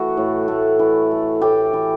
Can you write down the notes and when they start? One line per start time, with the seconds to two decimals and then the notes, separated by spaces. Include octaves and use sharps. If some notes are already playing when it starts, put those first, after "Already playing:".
Already playing: E3 A3 F#4
0.17 A2
0.48 A3
0.79 E3
1.11 A3
1.41 A2 G4
1.73 E3